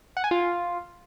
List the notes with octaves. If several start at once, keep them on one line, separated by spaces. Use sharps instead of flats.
F#5
G#5
F4